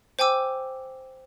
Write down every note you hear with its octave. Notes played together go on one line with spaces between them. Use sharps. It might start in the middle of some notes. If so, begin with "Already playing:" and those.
C5 G5 G#5 D6 E6